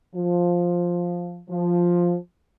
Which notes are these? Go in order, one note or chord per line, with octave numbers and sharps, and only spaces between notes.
F3
F3